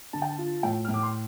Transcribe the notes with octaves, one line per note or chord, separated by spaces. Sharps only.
D3 A5
G5
A5
F4
A2 G5
A2 F6
D6
C6